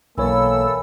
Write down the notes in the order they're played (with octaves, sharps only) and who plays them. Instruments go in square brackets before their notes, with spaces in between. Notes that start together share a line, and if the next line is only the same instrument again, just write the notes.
[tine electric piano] B1 C#5 [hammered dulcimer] E3 [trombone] A#3 [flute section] A4 E6